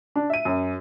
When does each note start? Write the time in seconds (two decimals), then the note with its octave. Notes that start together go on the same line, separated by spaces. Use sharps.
0.16 D4
0.30 E5 D#7
0.45 F#2